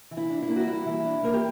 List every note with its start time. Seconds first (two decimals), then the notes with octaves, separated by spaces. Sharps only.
0.11 E3
0.17 E4
0.30 D4
0.42 E4
0.48 A#3
0.56 F#4
0.67 G3 E4
0.86 E3
1.05 D4
1.23 A#3 A#4
1.33 G4